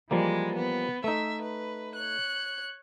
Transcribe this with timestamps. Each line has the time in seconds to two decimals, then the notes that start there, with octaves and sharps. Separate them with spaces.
0.11 E3 F3 G3 G#3 A#3
0.55 B3
1.04 A3 D#4 E5
1.41 B4
1.95 C#5 F#6